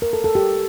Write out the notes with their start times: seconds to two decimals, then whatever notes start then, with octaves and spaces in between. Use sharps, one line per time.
0.02 A#4
0.13 A4
0.24 A4
0.35 G4